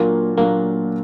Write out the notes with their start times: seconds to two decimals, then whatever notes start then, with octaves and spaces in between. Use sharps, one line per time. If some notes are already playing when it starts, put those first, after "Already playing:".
Already playing: A#2 F#3 A#3 D4 F4 A#4
0.37 A#2 F#3 A#3 D4 F4 A#4